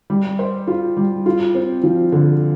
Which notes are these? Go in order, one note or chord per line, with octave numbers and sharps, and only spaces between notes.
G3
C5
F4
G3
F4
C4
F3
D3